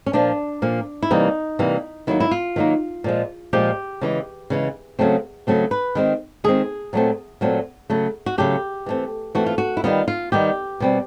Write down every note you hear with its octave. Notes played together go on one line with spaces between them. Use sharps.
C#4
A#2 F3 A#3 D4
A#2 F3 A#3
E4
C3 E3 G3 A#3 D#4
C3 E3 G3 A#3
D#3 F#3 A#3 E4
E4
F4
D#3 F#3 A#3
A#2 F3 G#3
A#2 F3 G#3 G4
C#3 E3 G#3
C#3 E3 G#3
C#3 F#3 A3 C4
C#3 F#3 A3 C4
B4
D#3 G#3 C4
D#3 G#3 C4 G#4
A#2 F#3 A3 C4
A#2 F#3 A3 C4
C#3 F#3 A3
F#4
C#3 F#3 A3 G4
E3 A3 C4
E3 A3 C4 F#4
F4
F#4
E4
D#3 G3 B3 F4
F4
D#3 G3 B3 G4
B2 G3 C4